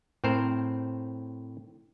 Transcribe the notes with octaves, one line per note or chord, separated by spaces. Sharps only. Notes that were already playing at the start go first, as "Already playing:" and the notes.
A2 C4 A#4 C5